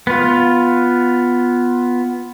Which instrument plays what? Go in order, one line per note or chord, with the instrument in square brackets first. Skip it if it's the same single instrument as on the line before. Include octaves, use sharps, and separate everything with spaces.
[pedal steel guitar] B3 F4